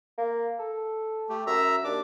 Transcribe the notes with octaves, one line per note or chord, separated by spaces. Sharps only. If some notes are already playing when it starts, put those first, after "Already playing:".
A#3
A4
A3 G4
F#2 E5 A#5 E6
D#2 D4 D6